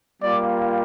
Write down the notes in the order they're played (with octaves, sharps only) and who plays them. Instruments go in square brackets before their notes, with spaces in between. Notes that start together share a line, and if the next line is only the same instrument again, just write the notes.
[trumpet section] G3 A#3 F4 D5